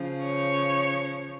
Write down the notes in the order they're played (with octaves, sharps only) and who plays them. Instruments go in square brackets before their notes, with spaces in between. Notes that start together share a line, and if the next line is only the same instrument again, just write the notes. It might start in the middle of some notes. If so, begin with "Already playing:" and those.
Already playing: [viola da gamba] C#3 F3
[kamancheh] C#5